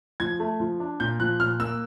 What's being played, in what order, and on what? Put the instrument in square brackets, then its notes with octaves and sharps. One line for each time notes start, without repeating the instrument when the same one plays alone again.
[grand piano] F3 G#6
A3
F3
D4
A#2 G6
F3 F#6
A#2 F6
A#3 E6